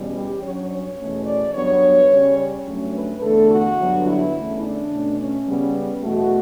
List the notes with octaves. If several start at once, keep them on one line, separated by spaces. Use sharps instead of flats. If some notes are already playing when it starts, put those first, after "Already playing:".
Already playing: E2 B2 G3 C#4
G4
G2 F#3 C#4 C#5
C#5
E2 B2 A3 C#4
D5
G2 F#3 B3 C#5
C#3 G3 C#4
C#5
G2 F#3 A3 C#4
B4
E2 D3 A3 A4
F#4
G2 D3 F#3 B3
E4
E2 D3 A3 C#4
D4
B2 A3 C#4
C#4
C#3 G3 B3
E2 B2 A3 F#4